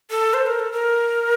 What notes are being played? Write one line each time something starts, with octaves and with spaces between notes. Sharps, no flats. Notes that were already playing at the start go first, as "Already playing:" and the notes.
A4
C5
A#4
A4
A#4